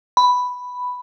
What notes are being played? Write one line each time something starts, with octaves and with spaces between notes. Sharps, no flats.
B5